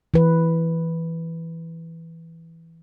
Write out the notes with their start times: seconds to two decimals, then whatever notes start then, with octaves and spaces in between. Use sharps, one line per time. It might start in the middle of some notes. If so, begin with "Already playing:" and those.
0.14 E3 B4